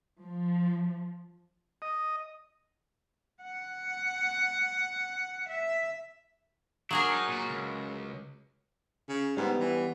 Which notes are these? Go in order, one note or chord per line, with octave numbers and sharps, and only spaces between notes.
F3
D#5
F#5
E5
F#3 D4 G#4 A#4
D#4
A#2 F#4
C#2
C#3
G#2 G3 B3
E3